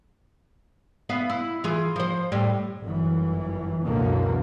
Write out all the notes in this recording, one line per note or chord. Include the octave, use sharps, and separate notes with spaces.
B3 E5 F5
E4
E3 F4 G#4
F3 C5
A2 G3
G1 F#2 E3
C#2 F#2 B2 D3 E3 A#3